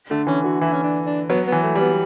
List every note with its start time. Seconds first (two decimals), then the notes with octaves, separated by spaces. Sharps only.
0.11 D3 A3
0.27 E3 C#4
0.44 D3 F#4
0.61 E3 E4
0.73 C#4
0.84 D4
1.06 D4
1.30 F#3 B3
1.47 B3
1.52 E3
1.63 A3
1.75 G3
1.80 B3